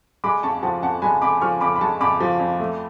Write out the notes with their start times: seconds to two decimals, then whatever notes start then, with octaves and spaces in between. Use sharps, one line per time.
0.24 G#3 B5 D6
0.43 F2 A5 C#6
0.63 F3 F#5 A5
0.83 F2 F#5 A5
1.02 G#3 G#5 B5
1.21 F2 B5 D6
1.41 F3 C#6 F6
1.61 F2 B5 D6
1.76 B5
1.81 G#3 A5 C#6
2.01 F2 B5 D6
2.20 F3
2.40 F2
2.60 A3